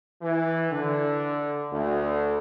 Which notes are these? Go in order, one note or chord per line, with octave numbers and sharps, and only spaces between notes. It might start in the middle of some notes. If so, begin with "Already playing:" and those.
E3
D3
D2